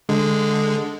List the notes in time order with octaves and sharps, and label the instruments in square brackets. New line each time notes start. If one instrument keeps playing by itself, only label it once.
[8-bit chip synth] D3 G#3